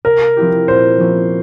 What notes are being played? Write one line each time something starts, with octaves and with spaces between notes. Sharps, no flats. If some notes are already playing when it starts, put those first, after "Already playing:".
C3 A#4
F3 C4 E4 G4
A#2 C5
F3 A#3 C#4 E4